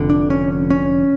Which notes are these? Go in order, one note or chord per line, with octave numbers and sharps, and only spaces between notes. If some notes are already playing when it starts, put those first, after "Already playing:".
Already playing: F1 F2 D3
D4
C#4
C#4